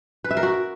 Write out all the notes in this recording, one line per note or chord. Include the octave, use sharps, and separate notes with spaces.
B4
E5
A#4
F#4